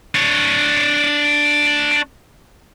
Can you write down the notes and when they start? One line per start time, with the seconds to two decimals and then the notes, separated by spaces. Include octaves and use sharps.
0.15 D4 C#5